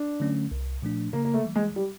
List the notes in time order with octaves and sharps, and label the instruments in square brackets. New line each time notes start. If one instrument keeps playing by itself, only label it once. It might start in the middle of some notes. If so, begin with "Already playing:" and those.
Already playing: [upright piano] D4
[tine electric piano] D3 F#3 A3 C#4
C2
A#2 F3 A3 D4
[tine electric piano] C#3 [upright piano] A#3
[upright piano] A#3
A3
[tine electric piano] E3 G3
[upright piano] G#3
G3